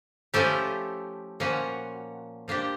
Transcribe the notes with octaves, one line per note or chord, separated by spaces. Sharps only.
F3 A3 C#4 E4 G4
A#2 F3 A#3 C#4 F#4
F3 A#3 D4 G4